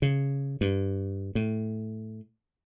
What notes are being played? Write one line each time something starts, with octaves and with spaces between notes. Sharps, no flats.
C#3
G2
A2